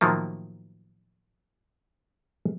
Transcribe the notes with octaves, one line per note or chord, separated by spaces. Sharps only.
A2 D#3 F3 F#3 A#3